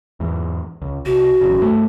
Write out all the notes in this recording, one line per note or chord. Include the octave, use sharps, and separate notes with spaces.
E2 G#2
C#2
C2 F#4
A1 F#2 C#3
G2 A3